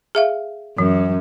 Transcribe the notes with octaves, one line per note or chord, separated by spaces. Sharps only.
G#4 E5 F5
F#2 E3